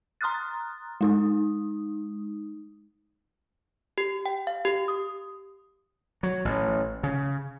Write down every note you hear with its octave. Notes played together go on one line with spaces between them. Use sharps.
A#5 C6 D#6 F6 F#6 A6
G#3 D#4 D#6
G4
G5
F5
G4
D#6
F#3
A1
C#3